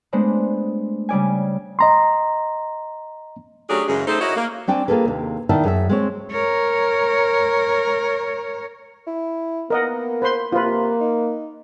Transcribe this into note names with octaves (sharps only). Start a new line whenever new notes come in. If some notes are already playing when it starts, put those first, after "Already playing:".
G#3 A3 B3 D4 C5 D5
C#3 G3 D5 G#5
D#5 A#5 C6
F#3 A3 C#4 D4 G4 G#4
F#2 C#3 E3 G#3
A3 D#4 G#4 A4 C5
E4 F#4 A#4 C#5 D#5
A#3
C4 D4 G5 G#5
A#3 F4 G#4 A4 B4
D#2 C3
B2 D#3 E4 D5 E5 A5
F#2 G#4 A4 E5
G#3 C4 C#5
A#4 C#5
E4
A#3 B3 A#4 D#5 F#5
B4 C5 C6
C3 A#3 F4 B4
D#4